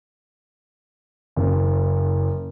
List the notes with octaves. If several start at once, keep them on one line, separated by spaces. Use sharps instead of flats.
F#1